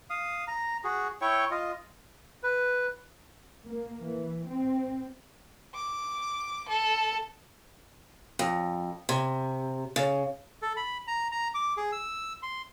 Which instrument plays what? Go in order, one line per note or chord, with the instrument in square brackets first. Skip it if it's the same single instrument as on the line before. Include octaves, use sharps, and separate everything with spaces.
[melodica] F5 D#6
A#5
F#4 G#4
E4 C#5 G5 C#6
F4 D#5
[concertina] B4
[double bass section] A#3
E3
C4
[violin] D6
A4
[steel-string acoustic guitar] F2
C3
C#3
[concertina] A4
B5
A#5
A#5
D6
G#4
E6
C6